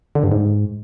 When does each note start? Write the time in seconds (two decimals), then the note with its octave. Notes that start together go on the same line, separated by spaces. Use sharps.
0.15 D3
0.23 G2
0.32 G#2